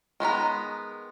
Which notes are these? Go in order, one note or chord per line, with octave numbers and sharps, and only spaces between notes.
D#3 G#3 B3 A#5